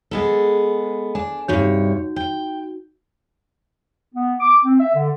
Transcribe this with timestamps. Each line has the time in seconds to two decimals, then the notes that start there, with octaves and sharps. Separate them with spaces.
0.11 G#3 B3 A4
1.15 D4 G#5
1.48 G2 C3 D#4 F#4 C#5 G6
2.16 G5
4.15 B3
4.40 D6
4.64 C4
4.80 E5
4.95 D3